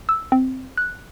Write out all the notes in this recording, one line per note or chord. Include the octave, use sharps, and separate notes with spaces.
E6
C4
F#6